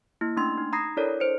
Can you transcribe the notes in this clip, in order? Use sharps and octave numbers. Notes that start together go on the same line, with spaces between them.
A#3 E4
A3 C#4 D4 C6 A6
D#4
A#5 B5 D#6 G#6 A#6 C7
D4 E4 A4 A#4 C#5 D5
C5 C#7